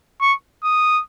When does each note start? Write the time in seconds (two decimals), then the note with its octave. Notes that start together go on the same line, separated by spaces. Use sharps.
0.21 C#6
0.64 D#6